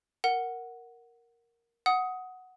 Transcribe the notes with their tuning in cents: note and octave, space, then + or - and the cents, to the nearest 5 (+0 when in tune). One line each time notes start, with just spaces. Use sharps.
A#4 +0 F#5 +0
F#5 +0 D#6 +15